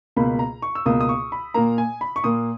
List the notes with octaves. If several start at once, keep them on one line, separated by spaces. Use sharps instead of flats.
C#2 B2 A#3 B5
A#5
C#6
E6
C#2 B2 A#3 D#6
D#6
C#6
B5
A#2 A#3 A#5
G#5
B5
C#6
A#2 A#3 D#6